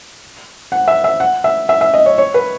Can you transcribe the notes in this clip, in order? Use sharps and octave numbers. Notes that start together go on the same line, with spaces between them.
F#5
E5
E5
F#5
E5
E5
E5
D#5
C#5
C#5
B4